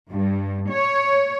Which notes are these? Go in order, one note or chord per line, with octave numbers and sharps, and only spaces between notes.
G2
C#5